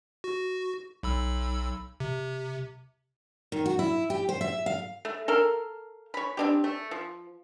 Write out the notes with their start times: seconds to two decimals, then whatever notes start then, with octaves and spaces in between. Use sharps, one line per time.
0.24 F#4
1.03 B1 B5 E6
2.00 C3
3.52 D#3
3.66 F#4
3.79 E4
4.10 G4
4.29 C5
4.41 E5
4.66 F5
5.05 A3
5.28 A4 A#4 F5
6.14 C#5 B5
6.37 C4 D4 G4
6.64 A3
6.91 F3